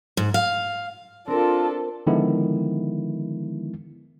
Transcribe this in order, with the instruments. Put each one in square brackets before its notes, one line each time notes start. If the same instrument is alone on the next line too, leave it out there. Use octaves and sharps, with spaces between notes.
[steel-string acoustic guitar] G#2
F5
[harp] C4 A#4 [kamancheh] D4 A4 [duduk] F4
[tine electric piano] D3 D#3 F3 G#3 B3 E4